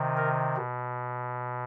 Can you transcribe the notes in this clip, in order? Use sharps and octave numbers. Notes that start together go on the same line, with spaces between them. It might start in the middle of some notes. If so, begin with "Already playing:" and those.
Already playing: C3 D#3
A#4
B2